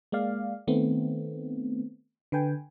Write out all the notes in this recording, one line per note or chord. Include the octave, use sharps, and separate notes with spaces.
G#3 A#3 D5 F5
D#3 A3 B3 C4
D3 B4 G5 G#5